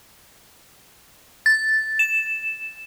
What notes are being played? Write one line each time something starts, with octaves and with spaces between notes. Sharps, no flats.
A6
E7